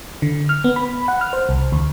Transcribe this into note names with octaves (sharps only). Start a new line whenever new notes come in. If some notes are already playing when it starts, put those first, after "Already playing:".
D3
F6
B3
B5
F#5
F6
C5
C2
D2